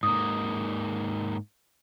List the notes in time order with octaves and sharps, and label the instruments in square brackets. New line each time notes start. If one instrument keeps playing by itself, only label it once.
[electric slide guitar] G#2 A#3 [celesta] D#6